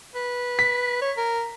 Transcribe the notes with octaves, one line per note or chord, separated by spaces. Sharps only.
B4
B6
C#5
A#4